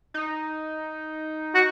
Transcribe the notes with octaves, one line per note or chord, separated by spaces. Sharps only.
D#4
F#4